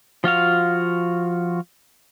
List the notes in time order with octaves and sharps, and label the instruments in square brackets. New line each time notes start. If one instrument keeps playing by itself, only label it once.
[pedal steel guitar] F3 F4 F#4 F5